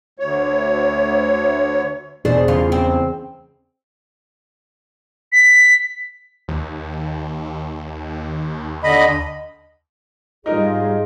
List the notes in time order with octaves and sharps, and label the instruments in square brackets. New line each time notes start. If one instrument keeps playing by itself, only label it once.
[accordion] D2 C#5
[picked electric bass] E2 B2 [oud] C4 D4 [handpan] G#4
[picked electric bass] E2 C#3 [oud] F4
[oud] C4
[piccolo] B6
[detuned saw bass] D#2
[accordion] D3 D#5 B5
[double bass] G#2 G3 [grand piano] D#4 A#4 [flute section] F4 G#4 D#5